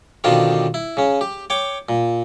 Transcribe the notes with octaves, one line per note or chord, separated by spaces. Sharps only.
B2 D3 D#3 C4 F4 G4
E4
C#3 C#4
G4
C#5 G5 D6
A#2